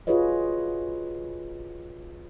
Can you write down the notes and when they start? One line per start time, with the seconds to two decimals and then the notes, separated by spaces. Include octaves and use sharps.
0.07 F4 F#4 G#4 B4 C#5 D#5